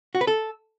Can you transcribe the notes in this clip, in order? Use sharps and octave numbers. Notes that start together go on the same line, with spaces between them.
F#4
B4
A4